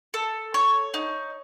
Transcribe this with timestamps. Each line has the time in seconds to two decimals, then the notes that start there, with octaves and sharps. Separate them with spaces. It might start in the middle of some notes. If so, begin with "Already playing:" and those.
0.14 A4
0.54 C#5
0.94 D#4